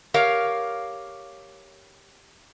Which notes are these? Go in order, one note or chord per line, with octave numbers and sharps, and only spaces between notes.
G4 A#4 C#5 F5